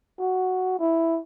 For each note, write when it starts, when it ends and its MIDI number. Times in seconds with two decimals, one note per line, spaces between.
0.19 0.78 66
0.79 1.19 64